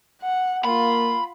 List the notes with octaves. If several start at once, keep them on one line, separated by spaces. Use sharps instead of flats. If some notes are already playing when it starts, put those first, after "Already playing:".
F#5
A#3 F4 B5